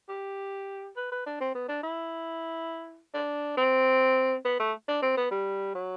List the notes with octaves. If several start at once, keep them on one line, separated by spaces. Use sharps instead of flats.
G4
B4
B4
D4
C4
B3
D4
E4
D4
C4
B3
A3
D4
C4
B3
G3
F#3